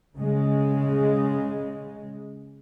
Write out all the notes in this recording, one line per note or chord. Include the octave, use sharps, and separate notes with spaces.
C#3 G#3